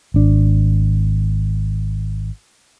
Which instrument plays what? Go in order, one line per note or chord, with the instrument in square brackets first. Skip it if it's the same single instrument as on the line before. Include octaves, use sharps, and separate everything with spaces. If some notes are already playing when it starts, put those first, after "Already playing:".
[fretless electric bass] G#1 D4